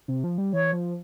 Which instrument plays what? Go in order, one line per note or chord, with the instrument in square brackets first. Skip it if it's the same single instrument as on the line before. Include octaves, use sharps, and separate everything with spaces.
[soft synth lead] C3
F3
G3
[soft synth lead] E3 [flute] C#5
[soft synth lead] F3